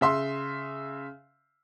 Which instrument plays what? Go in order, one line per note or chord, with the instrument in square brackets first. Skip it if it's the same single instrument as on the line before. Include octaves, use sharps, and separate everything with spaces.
[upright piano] C#3 E5 C6